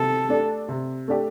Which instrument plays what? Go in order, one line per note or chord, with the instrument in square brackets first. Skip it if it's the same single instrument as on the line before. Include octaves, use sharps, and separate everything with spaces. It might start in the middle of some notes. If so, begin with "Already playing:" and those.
Already playing: [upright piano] C3 [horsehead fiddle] A4
[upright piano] A3 D4 G4
C3
A3 D4 G4